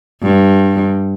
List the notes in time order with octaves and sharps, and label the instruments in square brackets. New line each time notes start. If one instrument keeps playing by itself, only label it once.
[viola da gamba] G2